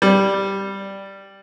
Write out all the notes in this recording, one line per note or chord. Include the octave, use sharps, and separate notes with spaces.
G3